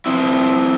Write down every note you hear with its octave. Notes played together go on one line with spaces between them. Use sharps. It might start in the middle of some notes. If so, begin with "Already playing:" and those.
F3 C4 E4